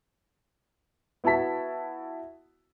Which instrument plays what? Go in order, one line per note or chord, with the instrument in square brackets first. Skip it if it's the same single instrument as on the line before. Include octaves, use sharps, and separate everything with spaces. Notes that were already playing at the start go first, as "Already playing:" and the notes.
[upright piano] B3 E4 F#4 A5 B6